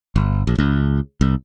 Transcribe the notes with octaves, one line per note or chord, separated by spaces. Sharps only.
G1
A#1
C#2
C2